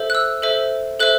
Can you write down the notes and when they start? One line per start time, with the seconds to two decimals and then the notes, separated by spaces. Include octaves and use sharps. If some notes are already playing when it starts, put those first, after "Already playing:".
Already playing: A4 C5 E5
0.10 F#6
0.15 E6
0.42 A4 C5 E5
1.00 A4 C5 E5 F#6